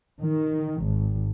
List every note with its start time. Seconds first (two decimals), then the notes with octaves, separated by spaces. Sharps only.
0.20 D#3
0.82 G#1